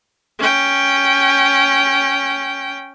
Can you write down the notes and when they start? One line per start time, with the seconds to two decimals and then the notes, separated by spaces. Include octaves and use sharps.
0.39 C#4 G5